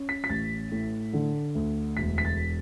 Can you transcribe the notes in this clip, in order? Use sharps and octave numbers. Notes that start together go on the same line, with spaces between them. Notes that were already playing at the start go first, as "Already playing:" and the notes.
Already playing: C#4
B6
B6
A1 A6
A2
D3
D2
E1 B6
B6
A6